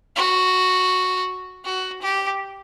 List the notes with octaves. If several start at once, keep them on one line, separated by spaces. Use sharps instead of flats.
F#4
F#4
G4